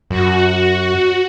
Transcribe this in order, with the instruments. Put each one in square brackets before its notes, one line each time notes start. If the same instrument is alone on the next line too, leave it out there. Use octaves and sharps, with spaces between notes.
[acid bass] F#2 [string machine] F#4